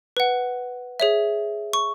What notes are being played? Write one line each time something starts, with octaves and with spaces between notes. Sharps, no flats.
B4 F#5
G#4 C#5 E5
C#6